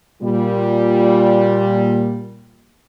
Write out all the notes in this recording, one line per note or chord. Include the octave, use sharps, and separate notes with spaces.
A#2 G3